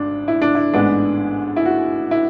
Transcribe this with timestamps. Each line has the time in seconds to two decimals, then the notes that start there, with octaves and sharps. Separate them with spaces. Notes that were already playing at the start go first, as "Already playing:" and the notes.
Already playing: G#1 D4
0.28 E4
0.42 D4
0.55 E4
0.74 A1 G#2 G#3 B3 D4
1.56 E4
1.65 F#4
2.11 E4